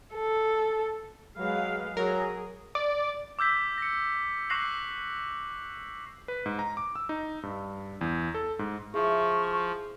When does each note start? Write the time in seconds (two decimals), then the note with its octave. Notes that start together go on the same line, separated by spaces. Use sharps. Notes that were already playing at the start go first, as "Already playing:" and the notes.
0.14 A4
1.38 F#3 G#3 B4 F5
1.97 F#3 G#4 A#4
2.75 D5
3.39 D6 E6 G6 B6
3.78 A#6 C#7
4.50 C#6 D6 F#6 A#6 C7 F#7
6.28 B4
6.46 G#2
6.59 A#5
6.77 D6
6.96 E6
7.09 D#4
7.43 G2
8.01 E2
8.34 A4
8.59 G#2
8.94 F3 E4 G#4 C#6